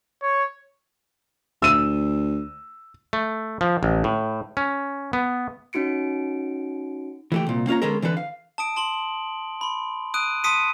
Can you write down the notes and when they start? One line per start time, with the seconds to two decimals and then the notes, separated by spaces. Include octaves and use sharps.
0.22 C#5
1.62 D2 E6 D#7
3.13 A3
3.61 F3
3.83 A1
4.04 A2
4.57 C#4
5.13 B3
5.73 C#4 D#4 F#4 C#7 D7
7.32 E3 A3 G4
7.47 C2 A#2
7.67 A#3 C#4 F4 C#5 A#5
7.82 D3 G#3 B3 C#4 A4 A#4
8.02 D3 E3 D4 A4 B4
8.17 F5
8.58 A5 D#6 D7
8.76 A5 C6 F#7 G7
9.61 B5 C6
10.14 D#6 F#6 D7 D#7
10.44 A5 C6 D#6 B6 C#7 D#7